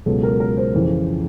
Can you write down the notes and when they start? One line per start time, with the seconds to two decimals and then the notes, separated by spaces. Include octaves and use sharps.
0.06 C#2 B2 F#3 B3 A4
0.23 A#4
0.40 A#4
0.57 C5
0.74 F2 C#3 E3